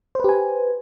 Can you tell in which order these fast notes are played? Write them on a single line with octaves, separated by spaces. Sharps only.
C5 B4 G4 G#5